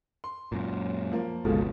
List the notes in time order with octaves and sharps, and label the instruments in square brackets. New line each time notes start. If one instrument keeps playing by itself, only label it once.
[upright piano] C6
[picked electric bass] F#2 A#2
[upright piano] F3 A#3
[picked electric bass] G1 C#2 [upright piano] B2 F3 [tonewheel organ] G#3 F4 A4